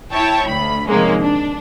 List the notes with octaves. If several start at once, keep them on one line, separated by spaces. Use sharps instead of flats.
E4 C#5 G5 A5
D2 B5
C3 D#3 F3 G#3 A#3 C#4
D4